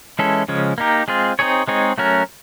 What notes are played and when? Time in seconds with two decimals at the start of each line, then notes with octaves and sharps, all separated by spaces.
0.19 E3 G#3 C#4 E4 A4
0.48 C#3 F3 G#3 C#4
0.78 A#3 D#4 G4 A#4
1.08 G#3 C4 F4 G#4
1.39 C4 D#4 G#4 C#5
1.68 G#3 C4 D#4 G#4 C#5
1.98 F#3 A3 C#4 F#4 A#4